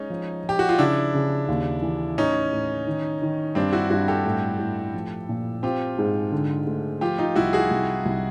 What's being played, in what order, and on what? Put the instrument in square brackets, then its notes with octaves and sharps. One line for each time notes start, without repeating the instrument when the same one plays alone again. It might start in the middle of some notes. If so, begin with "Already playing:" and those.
Already playing: [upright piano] G#3 [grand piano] C#4 D#4
[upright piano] F3
[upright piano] F3 [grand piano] G4
[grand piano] F#4
F4
[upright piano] C#3 [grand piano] D4 E4
[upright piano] C#3
D#2
E3
[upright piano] A2 [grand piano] C#4 D#4
[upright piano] A2
D#3
D#3
[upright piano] G2 [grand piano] C4 D4
[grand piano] E4 F#4
[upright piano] G2 [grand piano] E4 F#4
[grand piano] G4 A4
[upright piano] A2
A2
F3
A#2
[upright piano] C4 [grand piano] F4 G4
[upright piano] G#2
D3
A3
[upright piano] F3 [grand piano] F4 G4
[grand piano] D#4 F4
[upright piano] C2 [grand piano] E4 F#4
[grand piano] F#4 G#4
[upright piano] C2
C2